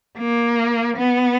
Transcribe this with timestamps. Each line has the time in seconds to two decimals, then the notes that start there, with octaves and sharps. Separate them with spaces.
0.18 A#3
0.98 B3